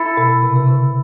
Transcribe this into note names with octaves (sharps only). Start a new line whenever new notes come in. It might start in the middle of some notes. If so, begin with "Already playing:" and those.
Already playing: E4 A4
B2
C3
C3
C#3